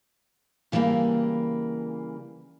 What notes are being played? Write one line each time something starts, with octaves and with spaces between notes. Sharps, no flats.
C#3 E3 G3 A3 A#3